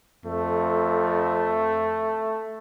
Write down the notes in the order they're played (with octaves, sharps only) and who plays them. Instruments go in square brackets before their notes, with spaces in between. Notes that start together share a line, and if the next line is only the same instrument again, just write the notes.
[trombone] F2 [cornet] A3